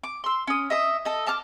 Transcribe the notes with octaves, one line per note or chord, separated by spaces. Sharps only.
D6
C6 E6
C#4 D#6
D#5 E5 D#6
A4 D#5
A5 D6 F6